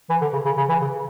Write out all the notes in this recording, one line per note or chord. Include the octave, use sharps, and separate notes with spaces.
E3
D3
C#3
C#3
C#3
E3
C#3